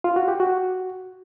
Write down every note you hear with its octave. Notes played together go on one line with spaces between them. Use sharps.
F4
F#4
G4
F#4